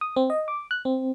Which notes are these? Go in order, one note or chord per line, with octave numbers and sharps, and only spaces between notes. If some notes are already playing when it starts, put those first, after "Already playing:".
D#6
C4
D#5
D6
F#6
C4